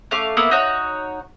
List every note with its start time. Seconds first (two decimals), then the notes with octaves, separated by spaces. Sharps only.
0.11 A3 C#4 F5 D6
0.37 A#3 B3 E4
0.51 D#4 F#4 C#5